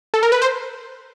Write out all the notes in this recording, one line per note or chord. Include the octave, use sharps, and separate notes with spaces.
A4
A#4
B4
C5